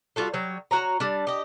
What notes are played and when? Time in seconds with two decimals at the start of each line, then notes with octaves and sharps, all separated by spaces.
0.16 G3 F4 F#4 A4
0.33 F#3 G3 C#5
0.71 F#4 C#5 A#5
1.00 G3 D4
1.27 G4 D#5